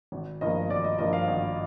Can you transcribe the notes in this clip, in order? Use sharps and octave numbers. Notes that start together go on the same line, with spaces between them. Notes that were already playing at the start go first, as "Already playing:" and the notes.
G#1
G2 F3 A#3 D#5
G#1 D5
D#5
G2 F3 A#3 D#5
F5
G#1